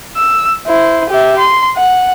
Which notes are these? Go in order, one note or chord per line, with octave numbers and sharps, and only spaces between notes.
E6
E4 C5
G4 E5
C6
F#5